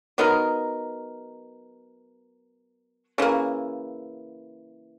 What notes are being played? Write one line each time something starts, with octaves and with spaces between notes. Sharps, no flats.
F#3 B3 D#4 A#4
C#3 E3 A#3